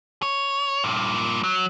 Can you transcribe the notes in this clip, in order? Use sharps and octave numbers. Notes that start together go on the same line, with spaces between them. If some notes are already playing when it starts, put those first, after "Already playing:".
C#5
G2 A#2
F#3